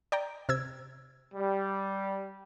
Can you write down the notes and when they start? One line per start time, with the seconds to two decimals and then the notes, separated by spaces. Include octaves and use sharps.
0.12 D5 G5 A#5
0.49 C3 E6 G#6
1.35 G3